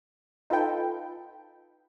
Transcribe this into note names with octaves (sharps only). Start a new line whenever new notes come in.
D#4 F4 A4 B4 G5